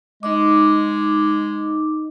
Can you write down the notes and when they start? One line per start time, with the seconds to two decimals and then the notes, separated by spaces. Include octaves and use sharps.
0.23 G#3 D#4 D#5 D6